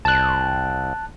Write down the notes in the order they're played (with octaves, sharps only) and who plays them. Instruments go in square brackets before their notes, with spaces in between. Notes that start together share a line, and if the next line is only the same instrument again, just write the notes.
[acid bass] C2 [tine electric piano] A5 F#6